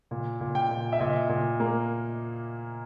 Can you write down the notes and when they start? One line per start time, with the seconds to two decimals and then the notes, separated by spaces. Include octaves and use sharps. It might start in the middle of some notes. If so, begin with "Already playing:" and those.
0.11 A#2
0.41 A#2
0.55 G5
0.71 A#2
0.93 E5
1.00 A#2 D#5
1.29 A#2
1.60 A#3